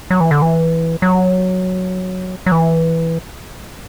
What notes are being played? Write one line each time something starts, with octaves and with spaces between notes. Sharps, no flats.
F#3
E3
D3
E3
F#3
F#3
E3